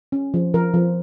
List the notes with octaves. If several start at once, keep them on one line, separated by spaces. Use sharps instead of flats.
C#4
F3
F3 A#4
F3